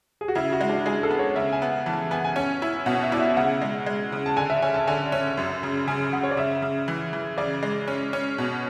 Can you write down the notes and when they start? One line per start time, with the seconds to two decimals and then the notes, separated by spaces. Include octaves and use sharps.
0.21 G#4
0.28 F#4
0.35 C#3 E4
0.52 F#4
0.61 G#3
0.69 D4
0.86 G#3 G#4
1.03 A4
1.11 B3
1.19 C#5
1.36 C#3 E5
1.52 G#5
1.62 B3
1.86 E3 A5
2.11 B3 G#5
2.24 G#5
2.36 C#4 G#5
2.62 E4
2.86 B2 F#5
3.03 E5
3.12 E4 D5
3.20 E5
3.37 C#3 F#5
3.62 G#3
3.86 G#3
4.12 C#3
4.26 A5
4.36 D3 G#5
4.50 E5
4.62 C#4 G#5
4.74 A5
4.87 D3 G#5
5.12 C#4
5.37 F#2
5.63 C#3
5.88 C#3 G#5
6.13 C#3 F#5
6.23 C#5
6.31 D5
6.37 C#3 E5
6.62 C#3
6.88 E3
7.13 E3
7.38 C#3 D5
7.63 G#3
7.88 C#4
8.13 C#4
8.38 B2